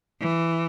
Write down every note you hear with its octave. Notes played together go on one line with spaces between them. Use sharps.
E3